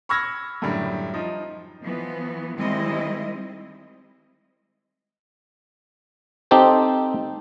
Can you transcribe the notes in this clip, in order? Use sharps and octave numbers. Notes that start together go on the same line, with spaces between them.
B5 C#6 E6 F6 G#6 A#6
F#2 A2 D3 G3
F3 D#4
E3 F3 B3
D#3 G3 G#3 C4 E4 D#5
C4 D#4 G4 A4 C5